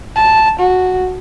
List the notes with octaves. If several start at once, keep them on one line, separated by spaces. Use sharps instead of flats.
A5
F#4